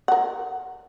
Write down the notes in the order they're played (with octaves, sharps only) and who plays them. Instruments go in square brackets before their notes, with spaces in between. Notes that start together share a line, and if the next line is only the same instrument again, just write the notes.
[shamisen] A#4 F#5